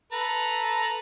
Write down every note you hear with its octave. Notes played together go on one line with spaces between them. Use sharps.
A4 B4 A#5